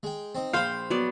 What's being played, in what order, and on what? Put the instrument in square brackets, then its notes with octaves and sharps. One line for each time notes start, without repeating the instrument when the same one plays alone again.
[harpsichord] G#3 G5
C4 D#4
[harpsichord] A#1 B5 [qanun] C5 G5 [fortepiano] F5
[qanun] F#3 B3 D5